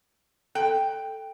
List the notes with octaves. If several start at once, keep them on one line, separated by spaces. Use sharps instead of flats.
A4 G5